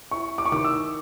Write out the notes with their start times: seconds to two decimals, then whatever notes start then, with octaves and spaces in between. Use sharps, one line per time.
0.11 E4 C#6
0.38 D6
0.45 C#6
0.52 D#3 D6
0.65 E6